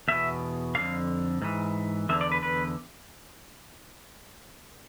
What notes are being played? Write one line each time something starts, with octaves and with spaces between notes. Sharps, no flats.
E2 B2 E5
F2 D3 F5
G#2 E3
E2 D3 E5
D5
B4
B4